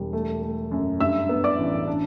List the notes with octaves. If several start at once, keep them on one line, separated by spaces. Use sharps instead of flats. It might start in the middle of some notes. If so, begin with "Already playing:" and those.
Already playing: E1 G3
A3
A3
F#2
G2 E5 E6
B3
D5 D6
A1
D4